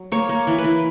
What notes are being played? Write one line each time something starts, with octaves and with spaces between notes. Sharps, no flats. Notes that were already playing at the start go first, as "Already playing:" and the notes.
Already playing: F#3
A#3 C#5
A#3
E3
B4
E3